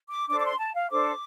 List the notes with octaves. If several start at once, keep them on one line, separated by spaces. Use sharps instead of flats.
D6
D4 A4 C5 D6
D6
C6
A5
F5
D4 A4 C5 D6